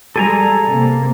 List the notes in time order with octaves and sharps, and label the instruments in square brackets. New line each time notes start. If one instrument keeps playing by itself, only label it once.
[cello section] G3 G#4 [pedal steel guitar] A4 G#5 A#5
[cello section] C3 A#3